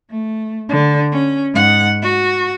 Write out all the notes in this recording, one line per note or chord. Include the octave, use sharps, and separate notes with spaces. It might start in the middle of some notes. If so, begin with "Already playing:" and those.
A3
D3
C#4
G#2 F#5
F#4